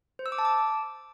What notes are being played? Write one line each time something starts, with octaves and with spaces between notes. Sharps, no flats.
C5
E6
D6
A5
D6